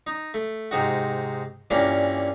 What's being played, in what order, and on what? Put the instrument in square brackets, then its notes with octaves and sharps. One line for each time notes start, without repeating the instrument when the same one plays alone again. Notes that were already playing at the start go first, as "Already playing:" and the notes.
[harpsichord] D#4
A3
G#2 C3 D#4 F#4
G2 A#2 E3 A#3 C#4 D4